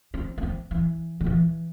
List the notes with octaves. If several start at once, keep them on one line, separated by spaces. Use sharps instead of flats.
C4
B3
C4
E3
D3
E3